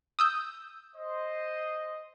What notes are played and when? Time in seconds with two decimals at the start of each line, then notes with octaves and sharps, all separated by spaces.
0.19 D#6 E6 G6
0.96 C5 D#5